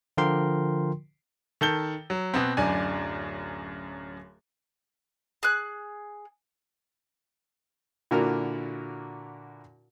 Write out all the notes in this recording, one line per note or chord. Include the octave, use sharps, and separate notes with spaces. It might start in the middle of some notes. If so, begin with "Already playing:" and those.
D3 F3 F4 A#4 G5 C6
D#3 A4 G6 G7
F#3
B2 B3 C4
D1 F#2 D4 G#5
G#4 F#6
A#2 D3 E4 F#4 A#4 F6